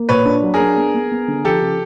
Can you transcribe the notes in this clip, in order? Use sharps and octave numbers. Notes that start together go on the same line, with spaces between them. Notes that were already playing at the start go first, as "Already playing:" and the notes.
Already playing: A#3
A#2 B4 C#5
D4
F#3
G#4 A#4
D4
B3
B3
B3
D3
F3 G4 A4
C#3